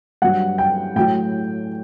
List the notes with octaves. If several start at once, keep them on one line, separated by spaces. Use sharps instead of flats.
G2 F#3 F#5
G5
A2 F#3 G5